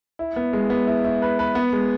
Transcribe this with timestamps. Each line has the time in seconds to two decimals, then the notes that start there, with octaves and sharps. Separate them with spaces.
0.19 E4
0.36 B3
0.53 G#3
0.70 B3
0.87 E4
1.04 E4
1.22 B4
1.39 B4
1.55 B3
1.73 G#3